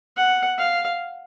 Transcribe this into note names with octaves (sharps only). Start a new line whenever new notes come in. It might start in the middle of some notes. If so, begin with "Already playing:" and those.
F#5
F5